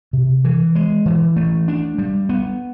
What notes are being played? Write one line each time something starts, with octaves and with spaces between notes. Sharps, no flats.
C3
E3
G#3
E3
A3
D4
G3
B3